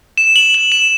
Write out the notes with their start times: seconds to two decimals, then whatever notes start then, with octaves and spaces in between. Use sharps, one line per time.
0.18 E7
0.36 F#7
0.54 F#7
0.72 E7